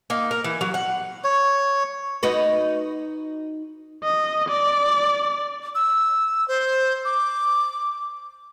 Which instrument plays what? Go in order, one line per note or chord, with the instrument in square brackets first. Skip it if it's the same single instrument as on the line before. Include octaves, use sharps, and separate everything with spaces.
[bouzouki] A#3 D#4
A#4
E3
F#3
F#5
[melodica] C#5
[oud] D#4 F#4 B4
[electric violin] D#5
D5
[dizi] E6
C5
D6